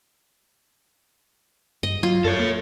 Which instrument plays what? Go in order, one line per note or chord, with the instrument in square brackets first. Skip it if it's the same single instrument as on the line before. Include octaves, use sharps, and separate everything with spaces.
[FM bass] G2 [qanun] D#5
[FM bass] F#3 [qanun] F4
[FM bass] F#2 [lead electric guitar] A4 C#5
[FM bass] A#3